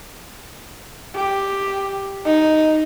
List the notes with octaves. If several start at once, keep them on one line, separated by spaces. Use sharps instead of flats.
G4
D#4